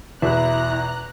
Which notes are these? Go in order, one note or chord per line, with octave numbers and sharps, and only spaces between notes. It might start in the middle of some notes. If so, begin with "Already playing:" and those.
E2 B2 E4 A#5 F#6